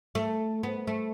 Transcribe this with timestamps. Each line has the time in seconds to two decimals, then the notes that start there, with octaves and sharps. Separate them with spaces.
0.15 A3
0.63 B3
0.87 A3